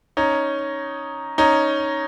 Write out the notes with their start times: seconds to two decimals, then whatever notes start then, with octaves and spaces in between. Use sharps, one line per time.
0.17 C#4 D#4
1.38 C#4 D#4